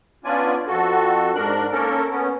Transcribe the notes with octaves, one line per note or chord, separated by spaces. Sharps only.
B3 C#4 D4 F4 D5 G#5
F2 F#4 A4
G#2 D4 A#4 F#6
A#3 C#4 A4 A#4
B3 C#4